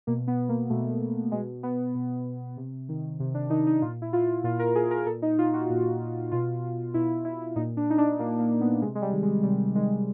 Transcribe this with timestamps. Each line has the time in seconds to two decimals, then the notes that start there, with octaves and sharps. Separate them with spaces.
0.07 B2 A#3
0.27 B3
0.49 A#3
0.70 B2 A3
1.32 B2 G#3
1.63 B3
1.95 B2
2.57 C3
2.89 D#3
3.20 C3
3.34 D4
3.50 D#3 D#4
3.67 D#4
3.82 A#2 F4
4.02 E4
4.13 F4
4.44 A#2 F4
4.59 A#4
4.75 G#4
4.91 A#4
5.06 A#2 A4
5.22 D#4
5.38 F4
5.53 F#4
5.70 A#2
6.32 B2 F4
6.94 B2 E4
7.25 E4
7.56 A#2 D#4
7.77 D4
7.90 D#4
7.98 D4
8.19 A#2 A#3
8.39 A#3
8.61 B3
8.82 C3 G#3
8.95 G#3
9.02 G3
9.12 D#3
9.23 G#3
9.43 C3 G3
9.75 D#3 G#3